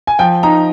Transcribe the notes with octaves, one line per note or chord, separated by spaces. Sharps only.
G#5
F3 G5
D#4 A#5